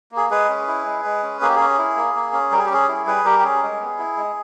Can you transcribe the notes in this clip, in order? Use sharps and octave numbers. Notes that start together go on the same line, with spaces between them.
A#3
G#4
G#3 G#4 B4
C#4
E4
G#3
G#3
C#4
A#3 G#4
G4
C#4 G#4
E4
A#3
A#3
C#4
G3 A#4
G#4
G4
C#4 G#4
E4
G3 G#4 B4
G3 G4 A#4
G4
C#4 G#4
G#3
B3
E4
G#3